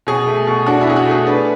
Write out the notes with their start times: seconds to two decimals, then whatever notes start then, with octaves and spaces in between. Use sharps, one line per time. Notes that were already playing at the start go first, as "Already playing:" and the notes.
0.07 B2 G#4
0.27 A3
0.47 B2
0.66 D4 F#4
0.81 E4
0.87 B2 G#4
0.96 F#4
1.06 A3 G#4
1.26 D4 B4